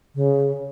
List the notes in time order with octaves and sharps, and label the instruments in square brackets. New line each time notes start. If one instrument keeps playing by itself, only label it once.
[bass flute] C#3